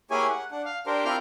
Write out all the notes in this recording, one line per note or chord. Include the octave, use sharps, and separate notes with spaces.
A#3 E4 G4 G#4 C#5 G#5
F#5
D4 F#5
F5
D4 G4 A#4 C5
C4 E4 F4 A#4 F6 G6